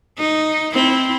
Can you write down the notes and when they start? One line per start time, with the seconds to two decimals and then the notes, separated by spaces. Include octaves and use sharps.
0.18 D#4
0.73 C4 E4